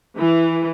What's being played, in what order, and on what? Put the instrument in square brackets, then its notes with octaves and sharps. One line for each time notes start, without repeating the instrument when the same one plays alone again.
[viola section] E3